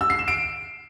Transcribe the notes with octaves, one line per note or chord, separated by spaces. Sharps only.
E6
C7
E7
D7